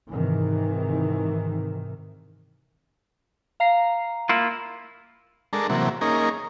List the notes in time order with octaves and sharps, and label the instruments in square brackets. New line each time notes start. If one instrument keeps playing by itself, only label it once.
[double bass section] G#2 C3 D#3 E3
[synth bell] F5 A#5 C7
[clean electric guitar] A#3 E4 F4
[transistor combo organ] G#3 D4 A4 A#4
C3 E3 F#3 A#3
A#3 C#4 D#4 G#4 A#4